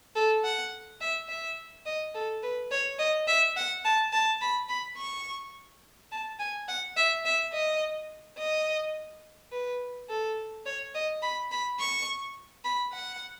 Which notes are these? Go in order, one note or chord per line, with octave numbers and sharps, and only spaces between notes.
A4
F#5
E5
E5
D#5
A4
B4
C#5
D#5
E5
F#5
A5
A5
B5
B5
C#6
A5
G#5
F#5
E5
E5
D#5
D#5
B4
A4
C#5
D#5
B5
B5
C#6
B5
F#5